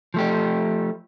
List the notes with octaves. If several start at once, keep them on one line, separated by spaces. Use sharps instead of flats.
F3 A3 G4